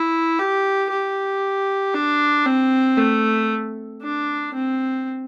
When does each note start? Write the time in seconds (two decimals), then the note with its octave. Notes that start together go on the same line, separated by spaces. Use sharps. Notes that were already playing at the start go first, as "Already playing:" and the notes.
Already playing: E4
0.39 G4
0.90 G4
1.94 D4
2.46 C4
2.97 A3
4.02 D4
4.54 C4